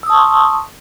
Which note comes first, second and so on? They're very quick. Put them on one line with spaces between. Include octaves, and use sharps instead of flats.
E6 D#6 A5 C#6 C6